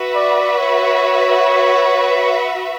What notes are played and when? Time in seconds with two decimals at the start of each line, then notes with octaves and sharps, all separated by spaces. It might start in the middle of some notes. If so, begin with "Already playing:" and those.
Already playing: F#4 B4 E5
0.15 D5
0.58 C#5